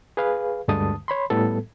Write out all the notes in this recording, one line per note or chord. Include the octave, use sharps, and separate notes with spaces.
G#4 B4 F5
D2 G2 D3 G#3 A5 D#6
C#5 B5 C6
A2 G3 B3 A4